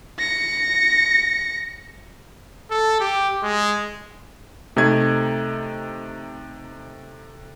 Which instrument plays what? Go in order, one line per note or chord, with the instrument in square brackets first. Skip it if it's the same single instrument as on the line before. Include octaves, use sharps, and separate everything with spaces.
[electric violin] A#6 C#7
[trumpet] A4
G4
G#3
[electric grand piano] C3 A3 D#4 G#6